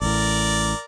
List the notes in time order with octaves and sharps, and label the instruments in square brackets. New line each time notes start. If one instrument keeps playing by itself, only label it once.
[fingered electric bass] A1 A2 [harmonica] A#4 D5